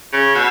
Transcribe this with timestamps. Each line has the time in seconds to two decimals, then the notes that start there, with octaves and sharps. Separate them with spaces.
0.13 C#3
0.35 B2